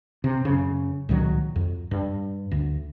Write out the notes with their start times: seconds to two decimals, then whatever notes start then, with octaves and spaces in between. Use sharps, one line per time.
0.24 C3
0.45 F#2 C#3
1.09 C#2 A#2 D#3 F#3
1.56 F2
1.91 G2
2.51 D2